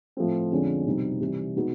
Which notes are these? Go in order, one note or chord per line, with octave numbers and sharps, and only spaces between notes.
A2 F3 A3 C4
F2 D3 F3 G#3 C#4
C2 B2 G3 C4 D#4
C3 E3 G3
B2 G#3 B3 D#4 F#4